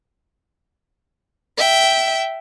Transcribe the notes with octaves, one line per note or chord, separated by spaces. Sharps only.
E5 G5